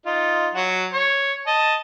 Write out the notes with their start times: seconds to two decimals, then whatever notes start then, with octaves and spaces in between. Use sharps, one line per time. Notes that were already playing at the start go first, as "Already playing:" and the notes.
0.06 D#4 F4
0.54 F#3 F#4
0.94 C#5 C#6
1.47 D#5 A5